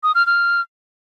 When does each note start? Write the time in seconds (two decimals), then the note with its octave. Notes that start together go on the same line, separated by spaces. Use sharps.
0.03 D#6
0.15 F6
0.27 F6